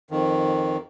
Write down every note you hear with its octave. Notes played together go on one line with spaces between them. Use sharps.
F2 D#3